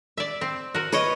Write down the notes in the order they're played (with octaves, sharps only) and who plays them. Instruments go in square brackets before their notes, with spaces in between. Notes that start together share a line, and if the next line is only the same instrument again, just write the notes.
[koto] D5 E5
C4
F#4 A#4
[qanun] B4 C#5 D#5